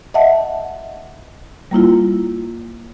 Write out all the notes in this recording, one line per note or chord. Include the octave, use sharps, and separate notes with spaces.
D#5 E5 F#5 A5
G3 A#3 E4 F4